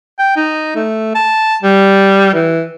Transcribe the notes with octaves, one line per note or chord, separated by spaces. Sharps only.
G5
D#4
A3
A5
G3
E3